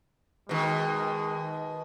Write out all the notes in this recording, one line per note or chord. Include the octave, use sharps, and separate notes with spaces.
B2 D#3 G#3